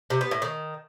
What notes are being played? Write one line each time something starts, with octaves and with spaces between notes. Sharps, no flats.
C3
B3
A2
D#3